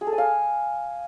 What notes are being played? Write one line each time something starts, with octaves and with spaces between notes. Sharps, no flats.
G#4
A4
G#5
F5